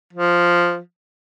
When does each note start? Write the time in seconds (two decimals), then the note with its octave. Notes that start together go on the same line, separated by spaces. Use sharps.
0.13 F3